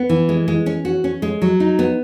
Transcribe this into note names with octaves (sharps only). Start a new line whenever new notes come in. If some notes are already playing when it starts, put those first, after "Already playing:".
Already playing: B3
E3
G#3
G#3
C#4
F#4
C#4
G#3
F#3
D#4
B3